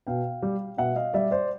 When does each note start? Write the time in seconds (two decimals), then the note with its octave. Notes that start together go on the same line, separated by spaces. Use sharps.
0.07 B2 F5 G5
0.42 G3
0.78 B2 E5 F#5
0.96 D#5 F5
1.14 G3 D5 E5
1.31 C5 D5